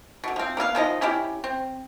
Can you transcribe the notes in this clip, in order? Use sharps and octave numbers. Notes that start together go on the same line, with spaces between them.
B2 D3
F3 C4
A#3 B3 E4 F5
D#3 F3 D#4 D#5
C#4 E4 G4
C4